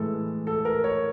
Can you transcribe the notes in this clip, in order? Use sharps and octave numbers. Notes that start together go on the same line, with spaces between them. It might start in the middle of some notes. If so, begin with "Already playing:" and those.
Already playing: A2 E3 G#3 A4
A4
A#4
C#5